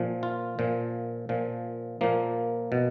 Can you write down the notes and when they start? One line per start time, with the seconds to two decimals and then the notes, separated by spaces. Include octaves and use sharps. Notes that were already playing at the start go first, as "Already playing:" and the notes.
Already playing: A#2 F3
0.23 F4
0.59 A#2 F3
1.29 A#2 F3
2.01 A#2 F3 A#3
2.72 B2